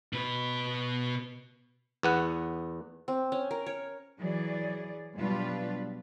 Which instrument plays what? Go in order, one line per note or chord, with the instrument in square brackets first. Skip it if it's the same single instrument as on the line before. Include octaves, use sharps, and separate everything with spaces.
[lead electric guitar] B2 B4
[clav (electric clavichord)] E2 B3 F#5
[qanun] C4
C#4
A#4
C#5
[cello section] E3 F#3 G#4 D5
B2 F#3 G3 D4 F4 B4